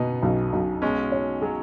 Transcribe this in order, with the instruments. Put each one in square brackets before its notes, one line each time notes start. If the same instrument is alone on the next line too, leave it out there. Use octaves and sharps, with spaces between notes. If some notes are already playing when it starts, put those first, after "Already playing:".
Already playing: [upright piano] B2 [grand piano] B3 D#4
[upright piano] B1
B1
[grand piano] G#3 C#4 [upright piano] B3
[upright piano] C#5
[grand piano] F#3 [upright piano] G#4